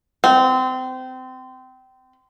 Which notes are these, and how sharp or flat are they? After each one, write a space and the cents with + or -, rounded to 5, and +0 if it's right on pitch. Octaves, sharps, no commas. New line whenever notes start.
C4 -25